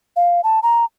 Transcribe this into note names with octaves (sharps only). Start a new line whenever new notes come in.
F5
A5
A#5